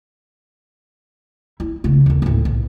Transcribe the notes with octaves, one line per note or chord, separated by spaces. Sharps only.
E4
C#3 A3
D#2 D3
D2 A2
B1